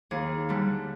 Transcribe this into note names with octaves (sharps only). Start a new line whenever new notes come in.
D#2 G#4
D3 G3